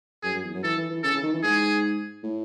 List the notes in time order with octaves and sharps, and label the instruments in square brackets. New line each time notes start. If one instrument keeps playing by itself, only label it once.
[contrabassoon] F#2 [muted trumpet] G#4
[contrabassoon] F#2
E2
F#2
[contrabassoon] E3 [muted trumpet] A4
[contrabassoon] E3
E3
[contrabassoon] C#3 [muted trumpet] A4
[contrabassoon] C#3
D#3
E3
[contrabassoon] G#2 [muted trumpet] G#4
[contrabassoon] A2